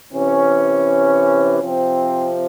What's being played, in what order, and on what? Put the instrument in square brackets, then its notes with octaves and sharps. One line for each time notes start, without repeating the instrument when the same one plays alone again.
[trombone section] C3 E3 C#4
C3 F3 C4